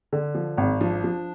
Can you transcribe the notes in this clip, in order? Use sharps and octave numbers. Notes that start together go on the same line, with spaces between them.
D3
F3
G#1
F3 D4
F3